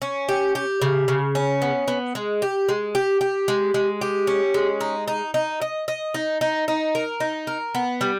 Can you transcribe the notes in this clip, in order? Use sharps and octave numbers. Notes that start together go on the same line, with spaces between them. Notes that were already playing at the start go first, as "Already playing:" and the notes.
C#4
G4
G4
C#3
C#3
C#4
B3
B3
G#3
G4
G#3
G4
G4
G#3
G#3
G4
C#4
G#3
D#4
D#4
D#4
D#5
D#5
D#4
D#4
D#4
A#4
D#4
A#4
B3
G3